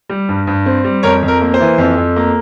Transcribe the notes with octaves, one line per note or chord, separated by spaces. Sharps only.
G3
G2
G2
C4
G3
F2 A#4 C#5
F2
A#4
A#3
C5
E3
F2
F2
A#3